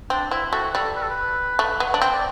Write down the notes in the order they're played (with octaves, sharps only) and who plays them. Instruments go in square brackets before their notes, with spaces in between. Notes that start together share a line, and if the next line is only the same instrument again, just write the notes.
[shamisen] C4 [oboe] D4
[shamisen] C4 [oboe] E4
[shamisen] A3 [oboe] F#4
[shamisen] G3 [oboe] A4
[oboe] B4
A4
B4
[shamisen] A3
B3
D4
C4
[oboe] D5